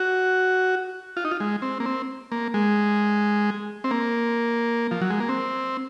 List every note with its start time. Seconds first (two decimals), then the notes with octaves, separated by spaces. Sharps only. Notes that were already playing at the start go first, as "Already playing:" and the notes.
Already playing: F#4
1.17 F4
1.25 D#4
1.31 F4
1.40 G#3
1.62 C4
1.80 A#3
1.86 C4
2.32 A#3
2.54 G#3
3.84 C4
3.91 A#3
4.91 F3
5.01 F#3
5.10 G#3
5.20 A#3
5.29 C4